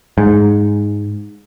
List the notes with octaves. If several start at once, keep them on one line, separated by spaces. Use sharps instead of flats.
G#2